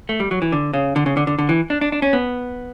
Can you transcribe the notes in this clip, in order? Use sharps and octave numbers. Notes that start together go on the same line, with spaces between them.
A3
G3
F#3
E3
D3
C#3
D3
C#3
D3
D3
D3
E3
D4
D4
D4
C#4
B3